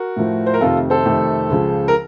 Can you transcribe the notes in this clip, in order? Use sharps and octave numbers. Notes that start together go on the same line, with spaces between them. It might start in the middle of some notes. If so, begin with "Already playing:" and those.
Already playing: F#4 A#4
A2 F3 A3
C5
A#4
F2 C3 D#3 A3 F4 A4
A4 C5
F2 C3 D#3 A3
C#2 C#3 F3
A#4